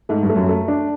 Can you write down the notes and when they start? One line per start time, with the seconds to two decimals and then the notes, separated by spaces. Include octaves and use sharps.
0.09 G#2 A3
0.23 G2
0.29 A3
0.36 F#2
0.49 A3
0.68 D4